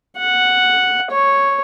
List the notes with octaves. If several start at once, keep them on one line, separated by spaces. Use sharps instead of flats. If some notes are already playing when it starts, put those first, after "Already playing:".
F#5
C#5